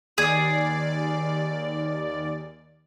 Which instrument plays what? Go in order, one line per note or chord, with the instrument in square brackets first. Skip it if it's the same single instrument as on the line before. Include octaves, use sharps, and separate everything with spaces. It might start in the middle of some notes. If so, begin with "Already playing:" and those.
[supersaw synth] D#2 D5 [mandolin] G#4